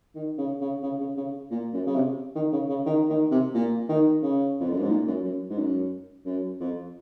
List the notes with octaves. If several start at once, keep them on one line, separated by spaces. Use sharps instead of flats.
D#3
C#3
C#3
C#3
C#3
C#3
A#2
F#2
C#3
C3
D#3
C#3
C#3
D#3
D#3
C3
A#2
D#3
C#3
F2
F#2
G#2
A#2
F#2
F#2
G#2
F#2
F#2
F2